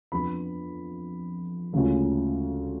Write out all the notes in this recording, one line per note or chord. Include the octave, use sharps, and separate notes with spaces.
F2 F3 B3 D4 F4 B5
D2 C#3 G#3 C#4 F4